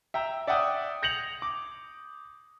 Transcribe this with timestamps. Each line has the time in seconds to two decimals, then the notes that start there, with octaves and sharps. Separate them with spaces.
0.14 E5 G5 A#5 E6
0.47 D5 E5 F#5 G5 D#6
1.03 G6 A#6 C#7 F7 F#7
1.42 D6